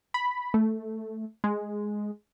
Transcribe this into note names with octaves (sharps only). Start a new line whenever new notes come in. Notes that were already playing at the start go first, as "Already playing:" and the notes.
B5
A3
G#3